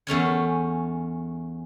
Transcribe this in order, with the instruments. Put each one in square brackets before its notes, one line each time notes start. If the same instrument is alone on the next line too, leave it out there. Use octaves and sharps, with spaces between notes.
[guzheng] E2 A3 C#4 G#5